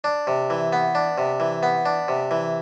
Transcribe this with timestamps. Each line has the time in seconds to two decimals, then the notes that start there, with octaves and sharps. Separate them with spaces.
0.04 D4
0.27 C3
0.50 E3
0.73 B3
0.95 D4
1.18 C3
1.40 E3
1.63 B3
1.85 D4
2.08 C3
2.31 E3